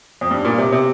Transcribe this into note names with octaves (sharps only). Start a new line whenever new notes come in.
F2
G2
A#2
C3
C3